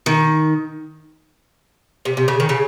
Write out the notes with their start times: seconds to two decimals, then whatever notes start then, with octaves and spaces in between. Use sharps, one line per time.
0.06 D#3
2.05 C3
2.17 C3
2.28 C#3
2.40 D#3
2.49 C#3